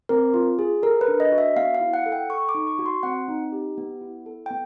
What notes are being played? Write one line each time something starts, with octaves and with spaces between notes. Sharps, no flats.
C4 A#4
F4
G#4
A4 A#4
B4
D4
D#5
F#4
E5
B3 F5
F5
E4
F#5
A4
G5
A4 C#6
D6
D#4
C#6
F#4
C6
C4 F#5
D#4
G4
B3
E4
A4
G5
B3